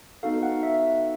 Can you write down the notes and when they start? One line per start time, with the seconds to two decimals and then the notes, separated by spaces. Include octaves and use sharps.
0.23 B3 D#4 F#4 A4 F5
0.43 F#5
0.63 E5